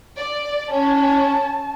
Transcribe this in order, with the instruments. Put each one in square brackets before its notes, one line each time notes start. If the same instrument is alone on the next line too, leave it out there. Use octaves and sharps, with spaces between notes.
[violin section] D5
[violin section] C#4 [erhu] A5